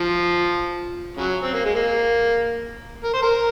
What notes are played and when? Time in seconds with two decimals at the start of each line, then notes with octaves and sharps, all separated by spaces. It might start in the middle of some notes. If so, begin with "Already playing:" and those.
Already playing: F3
1.17 C#3 F#3
1.43 C4
1.54 A#3
1.65 G#3
1.75 A#3
3.04 A#4
3.14 C5
3.22 A#4